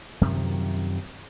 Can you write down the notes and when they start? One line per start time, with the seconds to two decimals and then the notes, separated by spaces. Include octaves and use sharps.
0.21 F#2 C3 D#3 F3